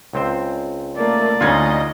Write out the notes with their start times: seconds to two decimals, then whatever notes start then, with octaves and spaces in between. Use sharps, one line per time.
0.13 C#2 C4 C5
0.96 A3 A#3 D5
1.41 D2 C#4 D#4 F4 D#5 G#6